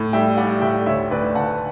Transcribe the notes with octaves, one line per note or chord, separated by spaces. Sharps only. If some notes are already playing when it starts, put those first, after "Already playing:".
Already playing: A2
G3 E5 G5
G3 D5 F#5
A2 E5 G5
D2 C#5 E5
D2 B4 D5
D2 F#5 A5